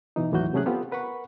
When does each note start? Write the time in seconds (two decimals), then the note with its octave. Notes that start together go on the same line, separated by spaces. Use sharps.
0.16 B2 E3 D#4
0.32 D#2 A2 E3 F#3 F#4 G6
0.53 C3 F#3 A3 C#4 G#4 F#6
0.66 B3 C4 F4 G4 A4
0.92 A#4 B4 F#5 B5 C#6